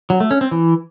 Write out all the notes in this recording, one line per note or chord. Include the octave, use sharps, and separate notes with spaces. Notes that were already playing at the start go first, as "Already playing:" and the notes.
F#3
A3
C#4
C4
E3